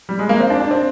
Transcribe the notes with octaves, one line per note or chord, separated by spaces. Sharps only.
G3
G#3
A#3
C4
D4
D4
C4